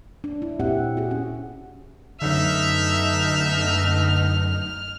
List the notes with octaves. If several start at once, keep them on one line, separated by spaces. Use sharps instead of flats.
D4
E4
A#2 C4 G4 E5 F#5
F#4 G#4
B3 C#4 F#5
F#2 D3 A3 B3 D#4 E5 F6